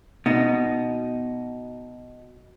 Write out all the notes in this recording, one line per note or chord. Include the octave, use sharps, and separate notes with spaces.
B2 D#4